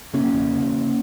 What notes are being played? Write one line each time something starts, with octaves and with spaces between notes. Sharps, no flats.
C#3 A#3 C#4
E2
C#3